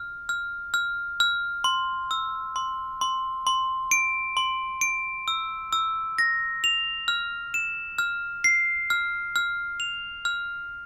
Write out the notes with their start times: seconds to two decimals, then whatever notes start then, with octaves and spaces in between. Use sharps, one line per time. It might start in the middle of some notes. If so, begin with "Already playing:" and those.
Already playing: F6
0.29 F6
0.74 F6
1.20 F6
1.64 C6
2.11 E6
2.56 C6
3.01 C6
3.47 C6
3.91 D7
4.37 C6
4.81 D7
5.28 E6
5.73 E6
6.18 A#6
6.64 F7
7.08 F6
7.54 E7
7.99 F6
8.44 C7
8.90 F6
9.36 F6
9.80 F7
10.25 F6